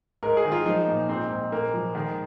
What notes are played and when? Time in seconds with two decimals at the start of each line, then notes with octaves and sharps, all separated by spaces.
0.23 G#2 A#4
0.37 G#4
0.45 D#3
0.52 F4
0.66 F3 D#4
0.87 A#2
1.08 G#2 C4
1.30 G#2
1.52 A#2 A#3
1.74 F3
1.95 D#3 G#3